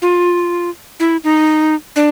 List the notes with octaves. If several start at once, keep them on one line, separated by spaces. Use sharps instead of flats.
F4
E4
D#4
D4